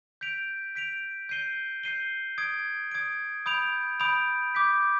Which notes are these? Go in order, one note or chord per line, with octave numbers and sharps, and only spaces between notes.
G6 B6 D7 F7
G6 B6 D7 F7
G6 C7 D#7 G7
G6 C7 D#7 G7
D#6 G#6 D7
D#6 G#6 D7
B5 D#6 G6 D7 F7
B5 D#6 G6 D7 F7
D6 G6 B6